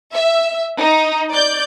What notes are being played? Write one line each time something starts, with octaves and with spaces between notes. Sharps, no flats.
E5
D#4
D5 G6